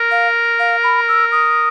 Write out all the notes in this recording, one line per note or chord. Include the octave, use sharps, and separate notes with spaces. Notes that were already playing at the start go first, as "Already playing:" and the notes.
Already playing: A#4
F5
F5
B5
E6
D#6